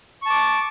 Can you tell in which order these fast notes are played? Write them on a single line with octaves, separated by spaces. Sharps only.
C#6 A5 D6